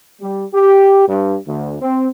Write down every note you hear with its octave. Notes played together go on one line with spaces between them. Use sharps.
G3
G4
G2
D2
C4